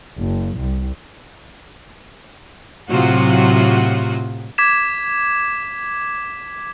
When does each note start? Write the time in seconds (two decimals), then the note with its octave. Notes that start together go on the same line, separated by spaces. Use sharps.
0.18 F#1
0.58 C2
2.90 A2 C3 F#3 F4 F#4
4.58 D6 G#6 B6 E7